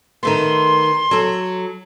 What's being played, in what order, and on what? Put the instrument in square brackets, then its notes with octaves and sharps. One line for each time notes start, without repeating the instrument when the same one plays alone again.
[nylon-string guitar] D#3 A3 B3 [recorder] C6
[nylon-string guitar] F#3 A4